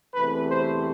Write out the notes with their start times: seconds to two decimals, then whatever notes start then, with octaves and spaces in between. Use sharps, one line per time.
0.14 E2 C3 E3 A3 B4
0.50 C5